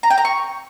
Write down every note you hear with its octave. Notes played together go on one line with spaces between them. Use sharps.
A#5
G5
A#5
C#6